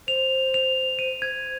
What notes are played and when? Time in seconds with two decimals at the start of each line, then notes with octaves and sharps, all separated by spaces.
0.08 C5 F7
0.54 F7
0.99 D#7
1.22 G#6